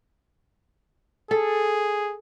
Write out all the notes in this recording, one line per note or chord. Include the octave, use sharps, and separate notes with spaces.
G#4 A4